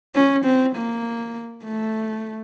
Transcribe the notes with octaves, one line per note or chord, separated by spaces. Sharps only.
C#4
C4
A#3
A3